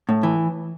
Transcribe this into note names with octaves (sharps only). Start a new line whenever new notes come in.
A2
E3